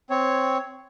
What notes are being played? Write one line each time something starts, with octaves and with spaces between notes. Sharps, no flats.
C4 C#5